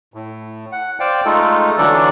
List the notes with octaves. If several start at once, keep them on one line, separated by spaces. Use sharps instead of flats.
A2
F#5
C5 D5 F5 G5
G#3 A3 D#4 F4 A4
D3 E3 F#3 D4 A4 D5